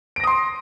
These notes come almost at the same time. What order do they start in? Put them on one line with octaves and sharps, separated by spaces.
D7 A#6 D#6 C6